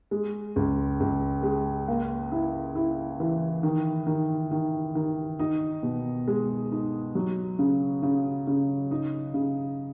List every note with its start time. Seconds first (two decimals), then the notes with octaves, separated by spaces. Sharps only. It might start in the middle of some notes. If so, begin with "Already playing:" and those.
0.11 G#3
0.56 C#2
1.00 C#2
1.43 G#3
1.88 A#3
2.32 E4
2.75 E4
3.20 E3
3.63 D#3
4.07 D#3
4.51 D#3
4.95 D#3
5.39 D#4
5.83 B2
6.28 G#3
6.71 D#4
7.15 F#3
7.59 C#3
8.03 C#3
8.47 C#3
8.91 D#4
9.34 C#3